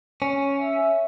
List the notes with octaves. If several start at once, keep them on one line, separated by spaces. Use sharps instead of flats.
C#4
E5